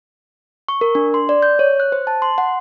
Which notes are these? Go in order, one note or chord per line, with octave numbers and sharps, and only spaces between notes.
C#6
A#4
D4
C6
D5
G6
C#5
F#6
C5
A5
C6
F#5